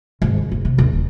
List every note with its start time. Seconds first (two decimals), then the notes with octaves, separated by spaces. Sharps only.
0.22 G#1
0.37 C#3
0.51 F1
0.65 C3
0.78 D1
0.93 D#1